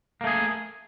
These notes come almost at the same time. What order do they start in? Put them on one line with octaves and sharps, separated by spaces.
A#3 A3 G#4